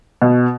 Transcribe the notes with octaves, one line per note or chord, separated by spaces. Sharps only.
B2